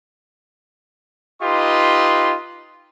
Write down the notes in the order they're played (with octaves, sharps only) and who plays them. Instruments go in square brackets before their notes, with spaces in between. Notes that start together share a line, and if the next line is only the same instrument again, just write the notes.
[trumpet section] D#4 F4 G4 B4 D#5 C6